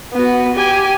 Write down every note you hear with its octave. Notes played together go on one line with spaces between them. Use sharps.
B3 F#4
G4 G#5